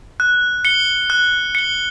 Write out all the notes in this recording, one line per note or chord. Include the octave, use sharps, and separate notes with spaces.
F#6
C#7 G7
F#6
C#7 G7